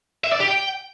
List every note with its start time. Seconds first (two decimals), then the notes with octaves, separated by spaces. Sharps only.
0.24 E5
0.32 D5
0.40 G4
0.48 G5